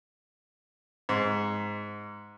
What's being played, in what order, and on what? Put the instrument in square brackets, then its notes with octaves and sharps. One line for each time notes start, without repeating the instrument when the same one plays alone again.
[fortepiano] G#2